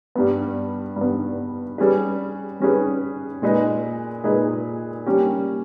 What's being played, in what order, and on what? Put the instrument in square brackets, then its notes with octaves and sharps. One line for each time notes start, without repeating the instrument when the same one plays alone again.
[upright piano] G2 G3 B3
G2 G3 B3
G3 C#4 G#4 B4
G3 C#4 G#4 B4
A#2 G#3 D#4 G#4 B4
A#2 G#3 D#4 G#4 B4
G3 A#3 C#4 G4